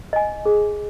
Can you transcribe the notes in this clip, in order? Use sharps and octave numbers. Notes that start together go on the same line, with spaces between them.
D#5 G#5
G#4